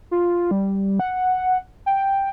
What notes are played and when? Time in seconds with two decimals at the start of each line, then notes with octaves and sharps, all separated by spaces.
0.11 F4
0.51 G3
1.00 F#5
1.86 G5